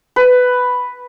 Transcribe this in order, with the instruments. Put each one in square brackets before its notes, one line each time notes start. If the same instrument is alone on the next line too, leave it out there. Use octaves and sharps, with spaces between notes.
[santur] B4